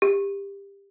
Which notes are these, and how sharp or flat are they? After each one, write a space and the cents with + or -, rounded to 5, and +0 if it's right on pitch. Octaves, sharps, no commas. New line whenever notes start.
G4 +20